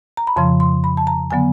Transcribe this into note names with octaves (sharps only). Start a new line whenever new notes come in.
A#5
B5
F2 C#3 F3 C6
C6
B5
A5
A#5
D3 F#3 B3 G#5